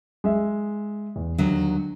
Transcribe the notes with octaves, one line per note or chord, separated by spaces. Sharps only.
G#3 E5
E2
D#2 D3 F#3